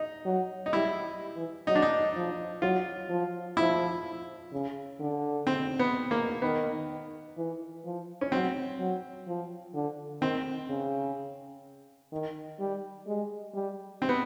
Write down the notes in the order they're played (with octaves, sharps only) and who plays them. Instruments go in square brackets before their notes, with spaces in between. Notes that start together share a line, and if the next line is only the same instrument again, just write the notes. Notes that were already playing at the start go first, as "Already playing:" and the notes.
Already playing: [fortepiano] D#4
[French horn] F#3
[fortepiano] D#4
[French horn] G3 [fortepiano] E4
[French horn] E3
[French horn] F#3 [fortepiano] D#4
[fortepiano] D4
D#4
[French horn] F3
[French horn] F#3 [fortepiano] F4
[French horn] F3
[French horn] F3 [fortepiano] E4
[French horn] C#3
D3
[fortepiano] C4
B3
A#3
[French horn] D#3 [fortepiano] B3
[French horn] E3
F3
[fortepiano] C#4
[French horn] F#3 [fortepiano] C4
[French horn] F#3
F3
D3
[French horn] D#3 [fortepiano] C4
[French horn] C#3
D#3
G3
G#3
G3
[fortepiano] C4
B3